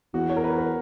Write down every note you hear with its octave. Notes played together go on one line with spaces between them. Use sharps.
E2 F#4
C#5
A#4
B4
A#4
B4